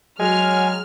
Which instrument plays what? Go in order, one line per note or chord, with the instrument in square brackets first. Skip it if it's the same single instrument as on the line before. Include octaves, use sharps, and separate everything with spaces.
[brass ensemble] F#3 [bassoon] G#3 [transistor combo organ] G#5 [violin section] F6